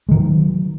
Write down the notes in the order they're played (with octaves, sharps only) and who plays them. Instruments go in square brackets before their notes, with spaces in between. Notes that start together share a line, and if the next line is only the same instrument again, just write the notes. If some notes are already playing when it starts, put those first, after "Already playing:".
[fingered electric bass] G#3
D#3
F#3